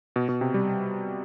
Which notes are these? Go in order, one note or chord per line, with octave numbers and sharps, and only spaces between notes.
B2
B2
C3
G3